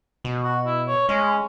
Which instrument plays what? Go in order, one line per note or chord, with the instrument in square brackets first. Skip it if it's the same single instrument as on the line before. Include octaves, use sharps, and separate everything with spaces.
[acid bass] B2
[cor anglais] F#4
E4
C#5
[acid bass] G#3 [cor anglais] C#4